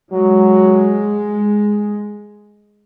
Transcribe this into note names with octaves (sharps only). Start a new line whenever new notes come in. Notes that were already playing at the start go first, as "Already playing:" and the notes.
F#3 G#3